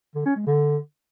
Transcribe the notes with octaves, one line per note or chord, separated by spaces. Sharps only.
D3
C#4
G#3
D3